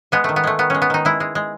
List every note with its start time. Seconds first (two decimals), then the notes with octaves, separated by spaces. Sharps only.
0.12 G#3 B3
0.24 D#3 A3
0.36 B3
0.44 G#3 A3
0.59 D#3 B3
0.70 G#3 C#4
0.82 B3
0.90 D#3 D#4
1.05 G#3 E4
1.20 G#3
1.35 G#3